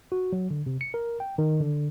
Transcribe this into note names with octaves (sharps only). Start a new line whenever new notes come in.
F#4
F#3
D3
C3
C#7
A#4
G5
D#3
D3